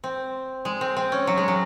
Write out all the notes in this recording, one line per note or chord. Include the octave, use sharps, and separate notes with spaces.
C4
G#3
C4
C4
C#4
F#3
G#3
F#3